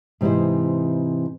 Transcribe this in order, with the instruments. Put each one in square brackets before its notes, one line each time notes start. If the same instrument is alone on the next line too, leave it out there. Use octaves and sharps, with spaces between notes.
[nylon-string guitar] G#2 C3 E3 D#4 E4 C5